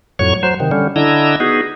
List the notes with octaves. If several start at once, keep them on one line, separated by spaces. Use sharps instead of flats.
F2 A2 F#3 C#5 C#6
F#3 C5
C3 D#3
D3 G3 C#4
D3 D4 E4 D#5 A#5 E6
B3 D#4 F#4 G#4